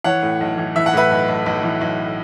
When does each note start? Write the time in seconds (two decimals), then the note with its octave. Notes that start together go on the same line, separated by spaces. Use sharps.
0.04 E3 C#5 F#5
0.22 A2
0.40 B1
0.58 E3
0.76 E3 E5
0.86 F#5
0.93 A2 B4 E5
1.11 B1
1.29 B1
1.46 B1
1.63 E3
1.81 B1